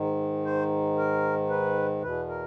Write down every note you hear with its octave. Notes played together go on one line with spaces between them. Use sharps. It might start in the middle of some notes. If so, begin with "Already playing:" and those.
Already playing: G#2 D#3
C5
A#4
B4
E2 B2 B4
A#4